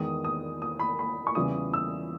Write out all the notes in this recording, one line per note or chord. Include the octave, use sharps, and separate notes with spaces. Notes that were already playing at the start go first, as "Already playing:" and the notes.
Already playing: E2 D#3 G#3 D#6
D#6
D#6
B5
B5
C#6
E2 C#3 E3 G3 D#6
E6